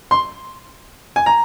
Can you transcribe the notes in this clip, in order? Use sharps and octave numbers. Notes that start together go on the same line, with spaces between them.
C6
G#5
A#5